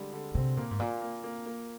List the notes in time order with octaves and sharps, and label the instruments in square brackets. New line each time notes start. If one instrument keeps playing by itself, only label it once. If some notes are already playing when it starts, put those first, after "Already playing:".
Already playing: [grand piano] D3 G3 G#3
D3
[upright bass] C3 [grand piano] C4
[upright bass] A#2 [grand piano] A#3
[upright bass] G#2
[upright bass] A#2 [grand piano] A#3
[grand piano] A#3
A#3
A#3